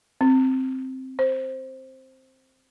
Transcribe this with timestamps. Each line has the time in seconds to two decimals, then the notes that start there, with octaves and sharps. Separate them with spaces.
0.21 C4
1.19 C5